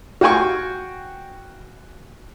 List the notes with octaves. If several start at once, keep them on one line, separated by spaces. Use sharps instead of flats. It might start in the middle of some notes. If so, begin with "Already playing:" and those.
F#4 F5 G5 G#5 C#6